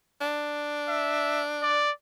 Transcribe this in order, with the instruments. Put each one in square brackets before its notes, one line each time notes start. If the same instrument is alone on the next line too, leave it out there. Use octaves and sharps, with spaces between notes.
[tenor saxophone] D4
[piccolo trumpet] E5
D5